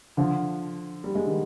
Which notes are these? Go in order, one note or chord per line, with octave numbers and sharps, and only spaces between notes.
D3 F3
G3
G#3
D#3 G3